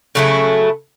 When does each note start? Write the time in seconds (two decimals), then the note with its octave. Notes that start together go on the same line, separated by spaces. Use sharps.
0.15 C#3 F#3 A3 E4